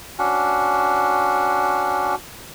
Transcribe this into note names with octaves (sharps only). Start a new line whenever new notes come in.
C#4 D4 F#4